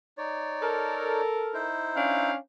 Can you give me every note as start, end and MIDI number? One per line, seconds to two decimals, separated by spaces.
0.18 1.21 63
0.18 1.21 73
0.18 1.21 74
0.61 1.65 69
0.61 1.65 70
1.54 2.31 63
1.54 2.31 64
1.54 2.31 72
1.95 2.35 61
1.95 2.35 62
1.95 2.35 77